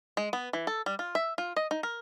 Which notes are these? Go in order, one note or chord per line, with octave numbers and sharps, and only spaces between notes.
G#3
B3
E3
A4
G3
F4
E5
F4
D#5
D#4
A#4